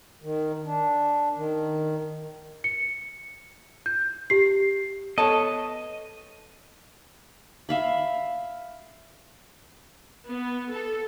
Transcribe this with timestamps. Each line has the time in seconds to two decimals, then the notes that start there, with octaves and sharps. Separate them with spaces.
0.22 D#3
0.65 D4
1.36 D#3
2.64 C#7
3.86 G6
4.30 G4 C7
5.18 B3 A4 C#5 D#5 A5
7.69 E5 F5 B5
10.26 B3
10.69 A4